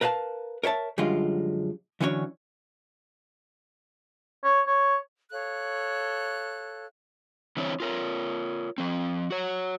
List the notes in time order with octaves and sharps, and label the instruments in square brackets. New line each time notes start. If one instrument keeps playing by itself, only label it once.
[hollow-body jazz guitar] A#4 B4 F5 G5 A5
A#4 C#5 E5 A5
F#2 D3 F3 G3 G#3 F4
D3 E3 F#3 C#4 D4 C#5
[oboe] C#5
C#5
[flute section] A4 C#5 F5 F#6
[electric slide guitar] D3 E3 C4 E4 G#4 C#5
F4 A#4 C#5
F3 C4
F#4 C#5